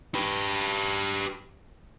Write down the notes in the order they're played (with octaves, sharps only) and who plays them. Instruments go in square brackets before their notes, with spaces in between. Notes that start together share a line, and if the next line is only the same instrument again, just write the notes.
[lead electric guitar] G4 B4